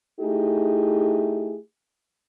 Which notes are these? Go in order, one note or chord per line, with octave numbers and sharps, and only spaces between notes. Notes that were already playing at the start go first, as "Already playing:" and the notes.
A3 D#4 E4 G4 G#4